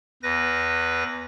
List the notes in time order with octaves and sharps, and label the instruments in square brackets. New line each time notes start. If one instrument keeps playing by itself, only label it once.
[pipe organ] E2 B4 A#6